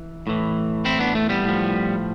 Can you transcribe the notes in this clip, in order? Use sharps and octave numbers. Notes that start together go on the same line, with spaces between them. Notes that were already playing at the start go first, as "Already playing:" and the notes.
Already playing: E3
A2 E3
C4 E4
B3 D4
A3
G3 B3
A2 F3